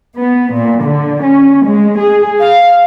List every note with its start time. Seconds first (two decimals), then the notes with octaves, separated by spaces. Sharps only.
0.16 B3
0.52 A#2
0.83 D3
1.23 C#4
1.65 G#3
1.97 G#4
2.40 F5